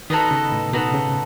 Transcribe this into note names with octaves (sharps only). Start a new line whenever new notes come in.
D#3 B3 D#4 F#4 A4
C#3
A2
B2 B3 D#4 F#4 A4
C#3